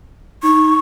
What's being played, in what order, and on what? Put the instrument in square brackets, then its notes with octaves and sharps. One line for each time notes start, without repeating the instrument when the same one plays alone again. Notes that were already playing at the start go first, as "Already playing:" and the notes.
[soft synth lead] D#4 [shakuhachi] C#6